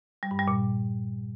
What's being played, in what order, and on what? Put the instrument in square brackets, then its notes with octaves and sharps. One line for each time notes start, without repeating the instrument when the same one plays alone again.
[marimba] G3
G2
G3
A#2